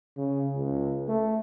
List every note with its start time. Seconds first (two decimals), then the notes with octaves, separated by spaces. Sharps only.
0.17 C#3
0.55 C#2
1.09 A3